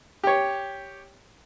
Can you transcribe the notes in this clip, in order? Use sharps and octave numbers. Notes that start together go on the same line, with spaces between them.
G4 C#5